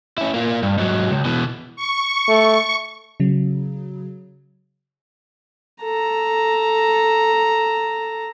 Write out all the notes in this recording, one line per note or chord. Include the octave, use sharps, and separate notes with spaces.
C#4 E4
A#3 F4
G2
G#2 F#3
C#2
B2 E3
C#6
A3
C#3 F#3
A4 A#5